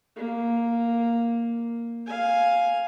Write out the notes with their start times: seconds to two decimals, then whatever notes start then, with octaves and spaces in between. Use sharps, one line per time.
0.16 A#3
2.06 F5 G#5